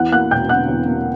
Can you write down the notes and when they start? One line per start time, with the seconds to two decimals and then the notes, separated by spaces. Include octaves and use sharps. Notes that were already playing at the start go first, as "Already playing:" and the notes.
Already playing: E2 F#5 F#6
0.12 A#3 F#5 F#6
0.31 E1 G5 G6
0.49 D3 F#5 F#6
0.69 E2
0.87 A#3